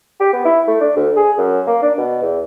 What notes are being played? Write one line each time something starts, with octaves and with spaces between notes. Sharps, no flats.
G4
B3
E4
A3
D4
D2
G#4
F#2
A#3
D4
B2
E2